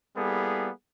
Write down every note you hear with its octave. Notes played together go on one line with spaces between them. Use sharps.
G3 A#3 B3 E4 G#4 A4